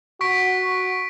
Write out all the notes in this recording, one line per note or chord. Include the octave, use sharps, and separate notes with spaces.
F#4 C#6 B6 D7